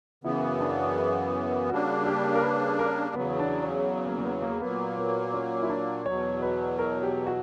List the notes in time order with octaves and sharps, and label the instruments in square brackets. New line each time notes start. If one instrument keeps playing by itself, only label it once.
[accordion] F#2 C#3 E3 B3 [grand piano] E4
[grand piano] D4
[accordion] C#3 G3 A#3 D4 [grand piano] F#4
[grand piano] G4
A#4
B4
A#4
[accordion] E2 C#3 F#3 [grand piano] B3
[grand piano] D4
C#4
A#3
A#3
B3
A#3
[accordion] A#2 F#3 A#3 [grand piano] B3
[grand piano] B3
C#4
E4
D4
[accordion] E2 B2 F#3 [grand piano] C#5
[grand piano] B4
A#4
G4
F#4